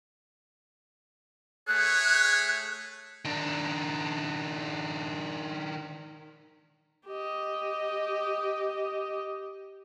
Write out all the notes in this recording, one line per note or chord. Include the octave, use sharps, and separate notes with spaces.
A3 G#4 C#5 F#6
D#3 D4
G4 D#5